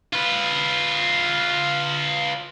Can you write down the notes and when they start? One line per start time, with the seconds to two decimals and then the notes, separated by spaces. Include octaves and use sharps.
0.13 F4 B4